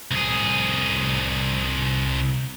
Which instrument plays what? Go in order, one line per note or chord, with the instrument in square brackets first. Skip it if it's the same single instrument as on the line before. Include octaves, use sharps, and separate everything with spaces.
[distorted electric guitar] C2 G#4